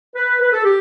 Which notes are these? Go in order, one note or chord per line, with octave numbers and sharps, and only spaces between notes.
B4
B4
A4
G4